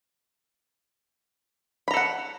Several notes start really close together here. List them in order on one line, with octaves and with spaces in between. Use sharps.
B5 A#5 A4 F#5